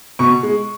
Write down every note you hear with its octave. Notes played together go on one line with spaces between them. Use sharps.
B2 C#6
G#3